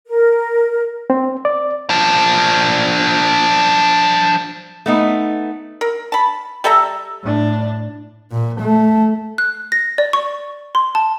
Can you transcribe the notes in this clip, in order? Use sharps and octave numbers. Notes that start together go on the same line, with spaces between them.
A#4
C4
D5
F3 D4
A3 B3 D#4
A#4
A5 B5
G3 A4 E5 A#5
A2 D4
A#2
A3
F#6
A#6
D5
C#6
C6
A5